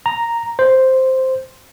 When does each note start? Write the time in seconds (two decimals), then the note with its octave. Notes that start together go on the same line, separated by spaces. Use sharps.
0.06 A#5
0.59 C5